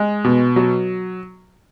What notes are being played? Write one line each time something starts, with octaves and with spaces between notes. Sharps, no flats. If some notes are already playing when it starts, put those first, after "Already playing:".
Already playing: G#3
B2
F#3